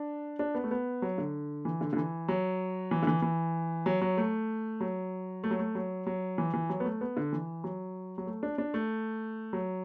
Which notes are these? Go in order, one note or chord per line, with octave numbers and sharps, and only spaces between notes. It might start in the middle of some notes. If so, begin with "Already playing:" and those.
Already playing: D4
D4
B3
A3
B3
F#3
D3
E3
D3
D3
E3
F#3
E3
D3
E3
E3
F#3
F#3
A3
F#3
A3
F#3
A3
F#3
F#3
E3
E3
F#3
B3
A3
B3
D3
E3
F#3
F#3
A3
D4
D4
A3
F#3